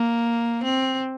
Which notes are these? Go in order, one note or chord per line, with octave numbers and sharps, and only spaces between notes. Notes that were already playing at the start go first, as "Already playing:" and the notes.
Already playing: A#3
C4